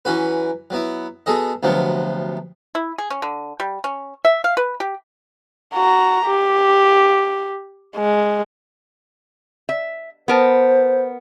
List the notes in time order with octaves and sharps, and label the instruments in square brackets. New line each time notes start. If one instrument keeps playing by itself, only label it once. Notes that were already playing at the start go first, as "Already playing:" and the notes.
[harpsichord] E3 F#3 C#4 F#4 B4
F#3 B3 E4
B2 G#4 A4 D#5
D2 C3 F3 F#3 B3
[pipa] E4
G#4
C#4
D3
G3
C#4
E5
F5
B4
G4
[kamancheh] F#4 A#5
G4
G#3
[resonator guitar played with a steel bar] E5
[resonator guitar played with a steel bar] B3 A#4 A5 [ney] C5